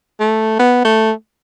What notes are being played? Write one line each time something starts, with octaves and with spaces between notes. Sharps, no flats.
A3
B3
A3